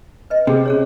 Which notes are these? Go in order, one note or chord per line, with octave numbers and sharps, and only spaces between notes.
B4 D#5
C3 G#4
C#4 G#4 C#5